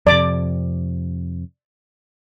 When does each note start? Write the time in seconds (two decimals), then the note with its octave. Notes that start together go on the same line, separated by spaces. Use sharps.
0.07 F2 C3 D5 D6